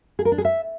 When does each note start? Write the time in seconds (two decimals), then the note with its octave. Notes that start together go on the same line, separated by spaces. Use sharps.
0.19 G#4
0.25 A#4
0.32 D4
0.38 G#4
0.45 E5